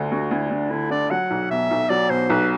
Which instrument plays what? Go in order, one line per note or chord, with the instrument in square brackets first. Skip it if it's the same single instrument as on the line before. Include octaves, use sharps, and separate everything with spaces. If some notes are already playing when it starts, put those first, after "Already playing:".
Already playing: [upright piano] D2 D3
[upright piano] D2 [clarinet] F#4
[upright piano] D2 [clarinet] E4
[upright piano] D2 [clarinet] D4
[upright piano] D3 [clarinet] E4
[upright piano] D3 [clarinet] D5
[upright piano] F#3 [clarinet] F#5
[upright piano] B1
[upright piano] B2 [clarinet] E5
[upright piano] B1
[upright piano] F#3 [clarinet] D5
[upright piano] B2 [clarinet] C5
[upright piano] B1 [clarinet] B4